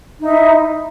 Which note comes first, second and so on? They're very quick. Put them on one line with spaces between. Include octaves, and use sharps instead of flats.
D#4 E5 E4